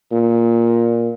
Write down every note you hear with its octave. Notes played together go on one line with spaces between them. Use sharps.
A#2